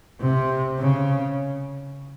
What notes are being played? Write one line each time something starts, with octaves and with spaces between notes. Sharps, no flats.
C3
C#3